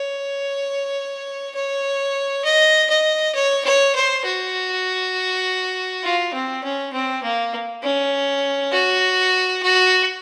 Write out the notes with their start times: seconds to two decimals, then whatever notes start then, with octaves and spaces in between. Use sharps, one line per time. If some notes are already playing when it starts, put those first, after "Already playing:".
Already playing: C#5
1.55 C#5
2.45 D#5
2.90 D#5
3.35 C#5
3.65 C#5
3.95 C5
4.25 F#4
6.03 F4
6.33 C4
6.63 C#4
6.93 C4
7.23 A#3
7.83 C#4
8.72 F#4
9.62 F#4